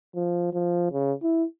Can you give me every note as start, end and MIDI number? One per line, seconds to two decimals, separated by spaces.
0.15 0.51 53
0.53 0.89 53
0.92 1.13 49
1.23 1.44 64